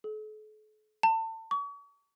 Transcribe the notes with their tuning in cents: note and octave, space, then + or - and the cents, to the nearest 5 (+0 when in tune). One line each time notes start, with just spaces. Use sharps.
A4 -45
A5 +30
C#6 +40